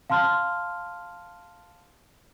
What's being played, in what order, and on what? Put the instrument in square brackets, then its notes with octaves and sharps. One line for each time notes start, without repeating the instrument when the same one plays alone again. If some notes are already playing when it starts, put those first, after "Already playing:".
[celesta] F5 A5 C6 F6